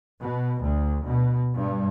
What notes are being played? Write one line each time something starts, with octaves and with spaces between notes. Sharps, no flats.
B2
D2
B2
G2